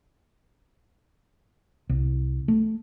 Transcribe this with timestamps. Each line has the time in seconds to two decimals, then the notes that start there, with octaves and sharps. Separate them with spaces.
1.89 C2
2.48 A3